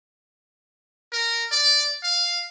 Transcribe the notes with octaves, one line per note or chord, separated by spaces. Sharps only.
A#4
D5
F5